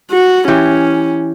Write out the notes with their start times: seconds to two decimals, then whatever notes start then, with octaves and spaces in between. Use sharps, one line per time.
0.11 F#4
0.48 E3 C#4 G4